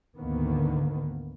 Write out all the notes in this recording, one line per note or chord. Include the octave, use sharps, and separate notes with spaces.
D2 G#2 D3 D#3 A#3 B3